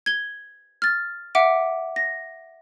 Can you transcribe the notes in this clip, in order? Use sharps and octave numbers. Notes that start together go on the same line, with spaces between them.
G#6 G7
F6 A6
E5 F#5 D6 D7
A#6